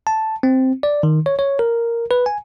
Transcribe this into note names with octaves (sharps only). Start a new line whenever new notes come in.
A5
C4
D5
D#3
C#5
C#5
A#4
B4
G#5